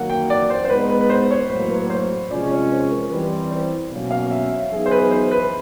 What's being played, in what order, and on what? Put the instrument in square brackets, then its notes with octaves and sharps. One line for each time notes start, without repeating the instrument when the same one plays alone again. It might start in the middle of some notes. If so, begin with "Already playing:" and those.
Already playing: [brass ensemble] D#3 F#3 A#3 [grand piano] F#5
[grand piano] G5
D5
C5
C5
[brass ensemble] G#3 B3 D#4 [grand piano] B4
[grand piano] B4
B4
C5
C#5
[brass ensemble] A2 F#3 A#3 [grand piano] C5
[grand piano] B4
C5
[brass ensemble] C3 F3 G#3 C#4 [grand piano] D5
[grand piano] C#5
C5
A#4
[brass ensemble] E3 G3 C4 [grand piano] B4
[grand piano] C5
[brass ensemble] B2 F#3 A#3 C#4
[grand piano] F5
E5
E5
[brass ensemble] F#3 B3 D#4 G#4
[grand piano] C5
B4
C5
B4